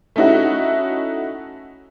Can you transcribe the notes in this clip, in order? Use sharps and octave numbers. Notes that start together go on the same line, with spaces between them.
A3 C#4 D#4 E4 F#4